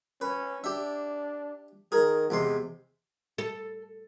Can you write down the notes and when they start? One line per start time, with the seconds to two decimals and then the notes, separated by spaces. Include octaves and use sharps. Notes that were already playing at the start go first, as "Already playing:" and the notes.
0.21 C#4 B4
0.64 D4 G4 E5
1.92 D#3 G#4 A#4 G#5
2.30 E2 C3 G#3 C6
3.38 A4